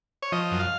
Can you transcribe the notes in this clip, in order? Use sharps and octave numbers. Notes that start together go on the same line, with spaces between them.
C#5
F3 D#5
F#2
F5